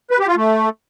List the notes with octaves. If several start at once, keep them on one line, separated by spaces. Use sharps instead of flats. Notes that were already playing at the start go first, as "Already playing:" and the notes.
B4
G4
F4
A3